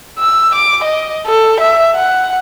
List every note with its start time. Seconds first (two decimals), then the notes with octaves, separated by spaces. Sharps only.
0.19 E6
0.55 D6
0.84 D#5
1.26 A4
1.60 E5
1.96 F#5